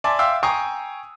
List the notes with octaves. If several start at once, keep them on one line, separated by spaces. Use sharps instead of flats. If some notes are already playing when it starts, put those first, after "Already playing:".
D5 E5 G#5 A5 C6 D6
E5 F5 G5 C6 D6 E6
G5 G#5 A#5 C#6 D#6 C7